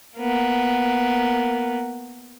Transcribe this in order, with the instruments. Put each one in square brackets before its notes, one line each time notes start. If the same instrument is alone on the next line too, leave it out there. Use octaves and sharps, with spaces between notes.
[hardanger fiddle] A#3 B3